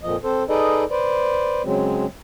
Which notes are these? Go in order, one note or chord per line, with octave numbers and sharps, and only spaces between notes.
F2 A#2 F3 D#5
C4 A4 C5
D#4 G#4 A4 B4 D5 D#5
B4 C5 D5
C#3 F#3 G#3 C4